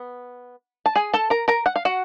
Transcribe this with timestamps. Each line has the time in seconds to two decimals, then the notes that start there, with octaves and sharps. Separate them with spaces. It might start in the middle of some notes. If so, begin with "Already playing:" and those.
Already playing: B3
0.86 A5
0.96 G#4 G#5
1.14 A4 A5
1.30 A#4 A#5
1.48 A#4 A#5
1.66 F#5
1.76 F5
1.85 F#4 F#5